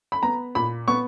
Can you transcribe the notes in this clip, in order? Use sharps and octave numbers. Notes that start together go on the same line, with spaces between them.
B5
B3 A#5
A#2 B5
B3 C#6